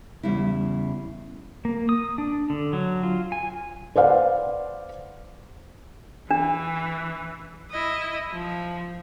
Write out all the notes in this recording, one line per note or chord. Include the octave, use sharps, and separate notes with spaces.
E2 C#3 G3 E4
A#3
D#6
D4
D3
F#3
F4
G#5
B4 C5 D5 F5 F#5
E3 D4
E4 D#5
F3